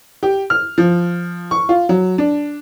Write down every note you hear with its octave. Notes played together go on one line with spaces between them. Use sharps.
G4
F6
F3
C#6
F4
F#3
D4